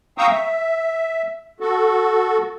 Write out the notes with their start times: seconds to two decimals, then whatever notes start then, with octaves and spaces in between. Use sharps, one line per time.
0.18 F5 G5 A#5 C#6 D#6 E6
0.31 E5
1.60 F#4 A4